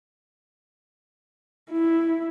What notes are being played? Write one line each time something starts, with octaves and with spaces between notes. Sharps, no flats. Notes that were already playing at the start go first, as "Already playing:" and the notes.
E4